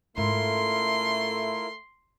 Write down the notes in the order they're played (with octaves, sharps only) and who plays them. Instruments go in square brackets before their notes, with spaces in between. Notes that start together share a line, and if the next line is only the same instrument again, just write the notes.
[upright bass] G#2 C#4 [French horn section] A3 [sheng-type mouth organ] E4 F4 A#4 [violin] C6